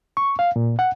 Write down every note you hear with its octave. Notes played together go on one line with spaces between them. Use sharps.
C#6
F5
A#2
F#5